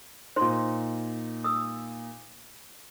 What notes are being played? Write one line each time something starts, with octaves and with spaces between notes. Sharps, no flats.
A#2 D#4 C5 C6
D#6 E6